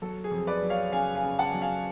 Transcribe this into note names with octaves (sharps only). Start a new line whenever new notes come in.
F#3 A4
G#4
F2
B4 D5
F#3
C#5 F5
C#3 F5 G#5
F5 G#5
C#3
F#5 A5
F#3
F5 G#5